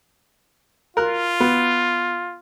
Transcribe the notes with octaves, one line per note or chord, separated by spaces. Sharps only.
F4 A#4 F#6
B3